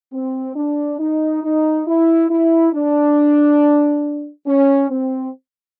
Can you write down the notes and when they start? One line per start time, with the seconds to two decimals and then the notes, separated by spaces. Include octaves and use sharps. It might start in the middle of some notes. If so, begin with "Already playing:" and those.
0.13 C4
0.56 D4
0.99 D#4
1.43 D#4
1.87 E4
2.30 E4
2.73 D4
4.47 C#4
4.90 C4